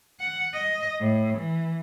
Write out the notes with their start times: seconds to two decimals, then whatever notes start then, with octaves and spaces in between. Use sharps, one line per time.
0.20 F#5
0.54 D#5
1.01 A2
1.38 E3